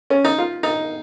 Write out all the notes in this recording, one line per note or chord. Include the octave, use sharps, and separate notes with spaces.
C#4
D#4
F4
D#4